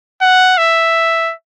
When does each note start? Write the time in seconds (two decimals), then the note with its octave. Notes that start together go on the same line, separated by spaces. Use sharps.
0.22 F#5
0.58 E5